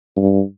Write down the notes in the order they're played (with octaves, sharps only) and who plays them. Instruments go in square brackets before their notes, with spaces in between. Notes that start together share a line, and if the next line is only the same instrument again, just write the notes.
[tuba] G2